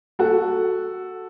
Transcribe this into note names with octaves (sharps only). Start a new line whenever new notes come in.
F#4 A4